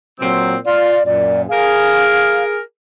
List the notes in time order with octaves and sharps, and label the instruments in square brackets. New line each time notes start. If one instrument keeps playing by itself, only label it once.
[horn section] A#2 F#3 C4
[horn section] F4 [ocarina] D5
[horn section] F#2 A#2 [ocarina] D5
[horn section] G#4 A#4 [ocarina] F5